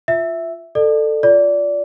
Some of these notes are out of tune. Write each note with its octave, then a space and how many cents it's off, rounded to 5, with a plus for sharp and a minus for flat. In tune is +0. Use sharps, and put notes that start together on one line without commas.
F4 +0 E5 +0
A4 +5 D5 +35
F4 +0 D5 -20